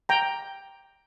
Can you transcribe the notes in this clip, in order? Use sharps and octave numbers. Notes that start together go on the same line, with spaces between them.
G5 A#5